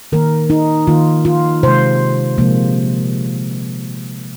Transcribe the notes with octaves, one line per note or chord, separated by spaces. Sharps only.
D#3 A#3 A#4
D#4
D#3 A#3 F4
F4
C3 G#3 C5
C3 F3 G#3 A#3